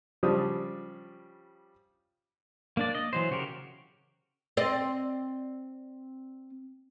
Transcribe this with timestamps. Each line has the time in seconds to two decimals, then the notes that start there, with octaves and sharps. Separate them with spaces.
0.23 C#3 F3 G3 D4 D#6
2.77 A#3 D4 D5
2.95 D#5
3.13 E3 F#3 C5
3.31 C#3 F#4 G4 A#4
4.57 C4 D5 D#5